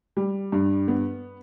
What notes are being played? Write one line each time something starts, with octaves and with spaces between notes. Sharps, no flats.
G3
G2
B3